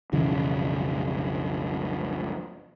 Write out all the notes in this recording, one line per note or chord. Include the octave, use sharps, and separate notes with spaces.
B1 F2 C#3 E3